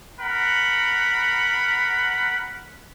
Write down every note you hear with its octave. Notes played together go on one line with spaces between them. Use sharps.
A#4 F#5 B5